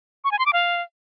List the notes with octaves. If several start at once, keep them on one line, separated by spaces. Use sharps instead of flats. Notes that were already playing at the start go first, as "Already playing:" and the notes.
C#6
G#5
C6
D6
F5